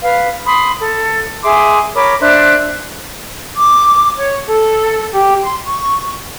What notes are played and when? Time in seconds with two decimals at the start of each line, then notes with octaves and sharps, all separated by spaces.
0.03 B4 F5
0.46 B5 C6 D#6
0.80 A4
1.44 G#4 E5 C6 D6
1.95 A#4 C#5 B5 D6
2.21 D4 C5 E5 F#6
3.55 D6
4.17 C#5
4.46 A4
5.13 G4
5.43 C6
5.65 C#6